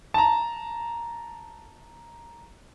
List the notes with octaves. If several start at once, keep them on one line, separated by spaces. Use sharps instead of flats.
A5 A#5